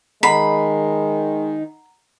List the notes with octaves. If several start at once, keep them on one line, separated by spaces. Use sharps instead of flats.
D#3 G#3 F#5 A#5 B5 C7